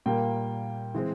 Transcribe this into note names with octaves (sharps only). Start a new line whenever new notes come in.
A#2 G3 A#3 G5
E3 G#3 C4